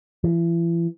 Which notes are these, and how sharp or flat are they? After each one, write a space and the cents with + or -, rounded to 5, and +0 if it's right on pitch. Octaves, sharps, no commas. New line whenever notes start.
E3 +35